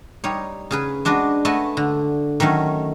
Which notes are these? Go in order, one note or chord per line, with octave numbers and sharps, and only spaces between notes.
G3 D#4 C#5
C#3 G#4 B4
G#3 D4 F#4 B4 D5
A3 F#4 B4 D#5 G#5 A5
D3
D#3 F#3 A3 C#4